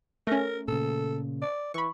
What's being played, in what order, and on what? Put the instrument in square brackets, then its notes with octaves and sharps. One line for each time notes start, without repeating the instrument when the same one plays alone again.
[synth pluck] A3 C#4 [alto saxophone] A#4
[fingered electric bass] A#2 C#3 [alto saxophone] A4
[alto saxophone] D5
[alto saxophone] E3 [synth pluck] B5 C#6